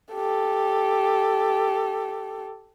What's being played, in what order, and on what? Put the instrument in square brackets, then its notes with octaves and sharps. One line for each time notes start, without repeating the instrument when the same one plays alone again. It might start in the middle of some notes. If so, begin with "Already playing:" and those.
[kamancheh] G4 A4